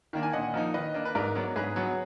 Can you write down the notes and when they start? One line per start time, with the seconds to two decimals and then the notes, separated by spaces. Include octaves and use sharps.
0.13 D#3 A#3 D4
0.23 G#5
0.33 A#2 D#5 F#5
0.54 F3 A#3 D#4
0.74 D#3 B4 D#5
0.94 A#3 D4
1.05 B4
1.15 G#2 A#4 D5
1.35 F#3 B3 D4
1.56 G#2 G#4 B4
1.76 F#3 B3